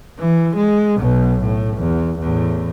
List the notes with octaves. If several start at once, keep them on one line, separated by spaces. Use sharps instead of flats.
E3
G#3
B1 B2
A2
E2
E2 A2